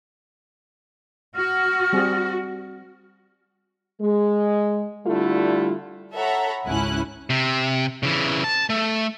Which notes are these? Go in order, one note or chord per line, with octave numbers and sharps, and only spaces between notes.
F#4 F6
G3 C4 G#4
G#3
D3 G3 A3 E4 F4
A4 C#5 E5 F#5 A#5 B5
G#1 C#2 C#4 E4 G#5 F#6
C3
C#3 E3
A5
A3